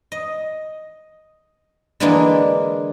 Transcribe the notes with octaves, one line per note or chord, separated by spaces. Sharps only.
D#5
D3 E3 G#3 A#3 D4 E4